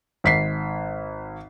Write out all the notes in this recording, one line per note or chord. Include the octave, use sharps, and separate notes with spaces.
G#1 B6 C7